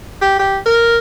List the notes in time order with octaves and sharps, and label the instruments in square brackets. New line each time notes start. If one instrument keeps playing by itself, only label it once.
[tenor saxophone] G4
G4
A#4